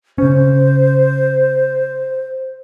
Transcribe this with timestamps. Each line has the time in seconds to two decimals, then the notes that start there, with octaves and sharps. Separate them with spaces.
0.18 C#3 C#4 C5